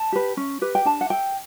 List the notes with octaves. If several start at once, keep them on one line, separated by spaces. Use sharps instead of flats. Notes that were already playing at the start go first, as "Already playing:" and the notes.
Already playing: A5
G4 B4
C#4
G4 B4
G5
D4 A5
F#5
A4 G5